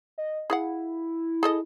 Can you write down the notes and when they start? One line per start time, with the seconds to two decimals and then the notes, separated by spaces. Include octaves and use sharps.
0.18 D#5
0.50 E4 G#4 F5 F#5
1.43 G#4 A4 D#5